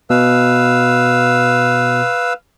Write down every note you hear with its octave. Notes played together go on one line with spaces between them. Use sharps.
B2 B4 F5 E6